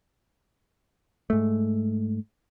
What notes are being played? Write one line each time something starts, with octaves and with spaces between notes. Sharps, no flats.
G#2 A3